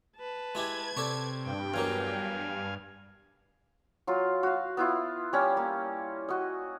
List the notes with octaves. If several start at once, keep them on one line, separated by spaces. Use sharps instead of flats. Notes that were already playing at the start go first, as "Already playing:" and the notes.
B4 A5
G#3 E4 G4 G#6
C3 A4 D5 C#6
G2 G5
E2 F#3 A#3 F5 G#5
F#3 F4
F#4 F5
B3 E4 F4
G3 C#4 D5
A#3
F#4 D#5